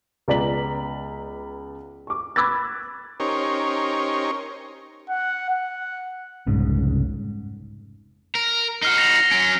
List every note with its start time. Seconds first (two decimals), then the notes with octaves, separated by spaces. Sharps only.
0.28 C#2 B3 D5 A#5 B6 F#7
2.07 C#6 D6
2.36 B5 D6 E6 F#6 G#6 A6
3.20 C#4 D#4 G4 A#4 C5 C#5
5.10 F#5
5.50 F#5
6.47 F1 C2 G#2 C#3
8.35 A#4
8.82 D#4 F#4 F6 C7 G7
8.98 A#6 F7
9.31 F#3 C#4 D7